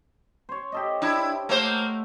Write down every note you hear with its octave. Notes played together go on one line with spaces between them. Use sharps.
C5 C#5
G4 A4 D#5
D4 E4
A3 A#3 C5 E5 F#5